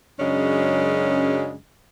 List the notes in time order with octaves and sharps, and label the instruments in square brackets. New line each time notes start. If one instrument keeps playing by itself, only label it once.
[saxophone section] F#2 C#3 F#3 G#3 C#4 D4